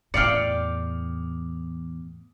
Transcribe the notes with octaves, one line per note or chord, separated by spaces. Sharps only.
E2 A2 D5 F5 G5 F6 C#7